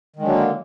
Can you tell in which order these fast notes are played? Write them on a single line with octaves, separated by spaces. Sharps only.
D#3 G#3 D3 F#3 A#3